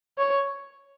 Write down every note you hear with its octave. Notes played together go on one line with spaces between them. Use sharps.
C#5